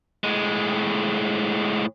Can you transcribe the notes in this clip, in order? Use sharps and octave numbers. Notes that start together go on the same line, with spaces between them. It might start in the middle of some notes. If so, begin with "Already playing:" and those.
A2 G#3